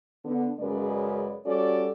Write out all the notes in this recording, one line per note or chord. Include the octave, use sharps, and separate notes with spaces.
D3 B3
F#2 C#3 G#3 A#4 B4 D5
G3 C#4 F#4 A4 D5